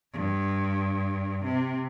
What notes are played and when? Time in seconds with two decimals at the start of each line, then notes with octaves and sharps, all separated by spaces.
0.13 G2
1.44 C3